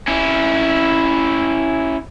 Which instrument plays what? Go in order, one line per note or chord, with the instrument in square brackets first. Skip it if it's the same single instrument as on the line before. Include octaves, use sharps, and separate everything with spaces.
[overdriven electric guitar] C#4 E4